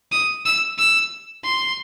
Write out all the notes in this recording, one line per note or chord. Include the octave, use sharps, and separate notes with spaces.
D#6
E6
E6
C6